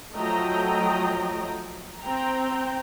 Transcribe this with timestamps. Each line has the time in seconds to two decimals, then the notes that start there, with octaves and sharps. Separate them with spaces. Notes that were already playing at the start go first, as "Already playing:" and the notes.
0.18 F3 F#3 A3 D#5 G5 A#5
2.01 C4 G5 A#5